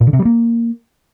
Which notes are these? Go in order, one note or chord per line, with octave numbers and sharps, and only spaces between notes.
A#2
D3
C3
G3
A#3